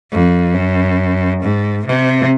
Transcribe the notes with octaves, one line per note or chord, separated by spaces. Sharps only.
F2
F#2
G#2
C3